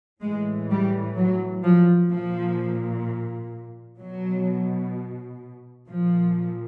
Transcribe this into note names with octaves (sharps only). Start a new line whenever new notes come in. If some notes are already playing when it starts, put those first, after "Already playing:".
A2 E3 G#3
G3
F#3
F3
A#2 F3
B2 F#3
A#2 F3